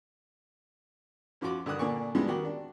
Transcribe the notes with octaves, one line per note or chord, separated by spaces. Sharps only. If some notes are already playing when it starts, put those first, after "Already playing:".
F#2 F3 F4 F#4 D6
G2 D3 D#3 D#6 F#6
A#2 D3 A#3 D5 G#5 C#6
E3 F3 G3 G#3 B3 D4
D#3 F#4 G4
D4